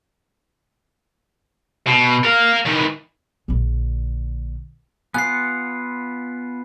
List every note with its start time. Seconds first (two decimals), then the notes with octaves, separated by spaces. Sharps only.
1.87 B2
2.24 A#4 F5
2.66 D#3 E3
3.48 A#1 D3
5.14 B3 F4 F#5 G#5 F#6 C7